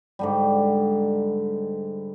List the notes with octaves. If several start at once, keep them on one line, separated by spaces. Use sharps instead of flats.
G#2 D3 G3